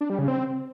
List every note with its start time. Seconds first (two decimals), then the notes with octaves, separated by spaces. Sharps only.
0.01 D4
0.10 G3
0.19 C#3
0.28 C4